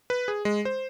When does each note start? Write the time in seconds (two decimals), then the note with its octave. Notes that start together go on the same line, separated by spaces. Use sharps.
0.10 B4
0.28 G#4
0.45 G#3
0.65 C5